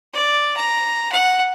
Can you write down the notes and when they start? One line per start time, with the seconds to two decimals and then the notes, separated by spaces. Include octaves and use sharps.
0.13 D5
0.57 A#5
1.12 F#5